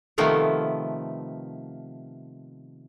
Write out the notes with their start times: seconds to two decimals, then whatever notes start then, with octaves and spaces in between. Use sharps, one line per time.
0.18 C3 D#3 F3 A3 B3